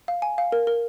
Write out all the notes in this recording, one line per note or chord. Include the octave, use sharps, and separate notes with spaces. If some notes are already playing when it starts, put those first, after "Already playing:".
F5
G#5
F5
A#4
A#4